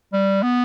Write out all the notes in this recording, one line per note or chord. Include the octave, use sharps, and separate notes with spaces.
G3
B3